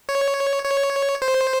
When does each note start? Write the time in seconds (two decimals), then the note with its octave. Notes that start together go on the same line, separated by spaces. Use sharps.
0.09 C#5
0.64 C#5
1.22 C5